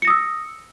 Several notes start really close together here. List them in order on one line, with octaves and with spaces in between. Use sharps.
C#7 A#6 D#6 E6